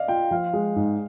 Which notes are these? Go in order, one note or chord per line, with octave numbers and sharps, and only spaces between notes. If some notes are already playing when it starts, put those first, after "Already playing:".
Already playing: D5 D#5 F5
F4 G5
F3 F5
G#3
G#2